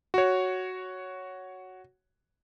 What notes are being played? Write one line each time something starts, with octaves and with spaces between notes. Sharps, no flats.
F#4 C#5